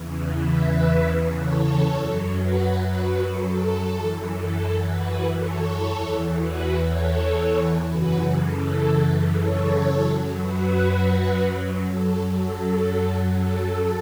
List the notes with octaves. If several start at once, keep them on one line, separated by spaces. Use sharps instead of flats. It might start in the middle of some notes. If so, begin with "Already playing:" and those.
Already playing: E2 C#3 E3
B4 E5
A4 C#5
F#2 F#3
F#4 B4
F#4 B4
A4
F#2 E3
A4
F#4 B4
A4 C#5
E2 E3
F#4 B4
A4 C#5
F#2 C#3 E3 F#4 B4
A4
A4 C#5
F#2 F#3
F#4 B4
F#2 F#3 A4
A4
A4